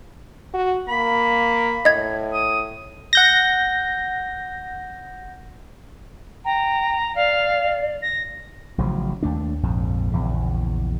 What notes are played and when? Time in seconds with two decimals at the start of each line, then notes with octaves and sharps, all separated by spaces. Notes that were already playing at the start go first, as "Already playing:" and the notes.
0.54 F#4
0.88 A#3 B5
1.85 A2 D#5 G#6
2.33 D#6
3.13 F#5 G6 A#6
6.45 G5 A#5
7.15 D5 F5
8.02 A#6
8.78 A1 C#3 F3 F#3
9.23 D#2 A3 D4
9.63 A#1 F2 G#2
10.12 A#1 E2 C#3